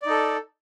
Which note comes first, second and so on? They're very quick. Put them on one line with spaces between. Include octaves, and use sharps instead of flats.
D5 D#4 A4